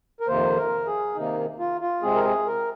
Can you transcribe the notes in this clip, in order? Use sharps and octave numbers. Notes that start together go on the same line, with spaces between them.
A#4
F2 C3 D#3 A#3 C5
A#4
G#4
C3 D#3 A#3 D#4
F4
F4
C3 G#3 C4 G#4
A#4
G#4
A#4